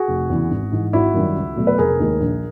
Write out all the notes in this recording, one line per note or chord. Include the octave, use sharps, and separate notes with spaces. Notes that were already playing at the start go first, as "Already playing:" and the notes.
Already playing: F#4 G#4
F1
E2 C#3 E3
G#1
G#2 E3
G#1 E4 F#4
F#2 D#3 G3
C#2
B2 F#3 A3
B4
F1 G#4 A#4
D#2 D#3 G#3
A#1